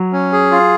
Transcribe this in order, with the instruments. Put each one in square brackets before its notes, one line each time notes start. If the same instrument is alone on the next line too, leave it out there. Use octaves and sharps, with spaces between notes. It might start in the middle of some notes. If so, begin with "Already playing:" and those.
Already playing: [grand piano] F#3
[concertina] C#4
G#4
F4